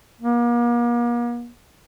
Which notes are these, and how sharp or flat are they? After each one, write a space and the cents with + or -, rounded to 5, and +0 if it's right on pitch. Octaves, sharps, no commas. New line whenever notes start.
A#3 +40